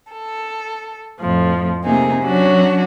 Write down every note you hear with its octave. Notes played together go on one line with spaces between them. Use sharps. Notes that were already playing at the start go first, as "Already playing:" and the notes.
A4
F2 A2 F3
C3 A3 A#3 D#4 G#4
F#3 C#4 D4 F#4 C#5